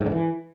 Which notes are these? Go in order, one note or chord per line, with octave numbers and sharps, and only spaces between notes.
G#2
D3
E3